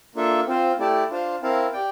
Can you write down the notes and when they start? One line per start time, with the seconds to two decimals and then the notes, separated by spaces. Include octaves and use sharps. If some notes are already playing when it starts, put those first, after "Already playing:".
0.15 A#3 D4 F4 A4 E5
0.47 C4 F4 C5
0.78 A3 E4 G4 D5 A5
1.10 D4 F4 C5 F5 A5
1.42 C4 E4 A#4 F5 A5
1.73 G4 D5 G5